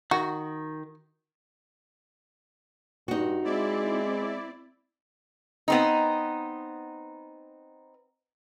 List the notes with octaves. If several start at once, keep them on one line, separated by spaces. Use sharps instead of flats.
D#3 F#4
G2 D#4 F#4
G#3 C4 E4 D5
B3 C4 D#4